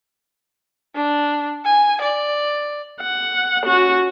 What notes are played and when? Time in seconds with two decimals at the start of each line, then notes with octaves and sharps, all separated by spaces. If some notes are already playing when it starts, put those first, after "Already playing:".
0.95 D4
1.65 G#5
2.01 D5
3.01 F#5
3.64 C#4 F#4